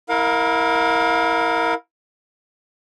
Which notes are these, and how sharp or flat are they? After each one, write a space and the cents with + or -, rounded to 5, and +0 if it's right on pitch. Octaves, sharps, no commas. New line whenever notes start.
E4 -15 A#4 +0 F5 +35